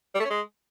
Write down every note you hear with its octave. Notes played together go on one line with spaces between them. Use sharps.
G3
A3
C#4
G#3